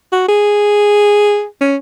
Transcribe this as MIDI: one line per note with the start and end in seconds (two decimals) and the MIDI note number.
0.12 0.24 66
0.29 1.45 68
1.61 1.76 61